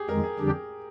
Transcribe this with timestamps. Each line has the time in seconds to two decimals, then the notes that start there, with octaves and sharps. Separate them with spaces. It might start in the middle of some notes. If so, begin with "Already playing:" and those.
Already playing: G4 G#4
0.09 F2 D#3 G#3 A#4
0.23 G#4
0.39 F2 D3 G3 D4 G4